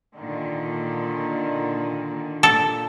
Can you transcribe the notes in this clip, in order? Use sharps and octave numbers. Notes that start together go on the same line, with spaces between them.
A#2 D3 D#3
A#2 A4